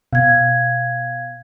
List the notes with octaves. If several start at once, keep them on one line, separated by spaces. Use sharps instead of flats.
B2 F5 G#6